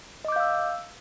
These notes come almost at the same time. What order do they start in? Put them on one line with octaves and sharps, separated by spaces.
D#5 D6 G6 F5 E6